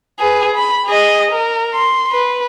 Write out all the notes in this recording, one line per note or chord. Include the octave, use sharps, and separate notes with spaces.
G#4 B4
B5
G#4 D#5
A#4
C6
B4